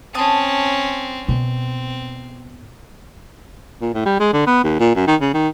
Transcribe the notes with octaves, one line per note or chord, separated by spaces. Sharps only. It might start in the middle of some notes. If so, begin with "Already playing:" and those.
C4 C#4 A5 D#6
B2 C4
A#2
A2
G3
G#3
D3
B3
D#2
A#2
F#2
D#3
C#3
D#3